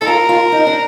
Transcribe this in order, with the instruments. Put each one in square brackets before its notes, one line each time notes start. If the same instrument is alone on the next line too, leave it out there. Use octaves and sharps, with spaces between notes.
[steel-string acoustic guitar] E4 [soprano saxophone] A4
[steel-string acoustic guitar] F4 [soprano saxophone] A#4
[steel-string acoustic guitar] F4
D#4
D4